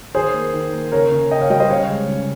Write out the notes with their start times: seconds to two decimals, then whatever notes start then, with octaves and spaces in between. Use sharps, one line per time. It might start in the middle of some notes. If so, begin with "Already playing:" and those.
0.15 D#3 G#4 C5
0.34 A#3
0.54 D#3
0.73 A#3
0.92 C#3 A#4 C#5
1.12 C#3
1.31 C#3 D#5 G5
1.41 C#5 F5
1.50 G3 D#5 G5
1.60 C5 D#5
1.69 C#3 C#5 F5
1.89 G#3
2.08 C#3